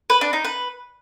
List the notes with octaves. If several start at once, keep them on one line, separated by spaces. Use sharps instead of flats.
B4
D4
D#4
B4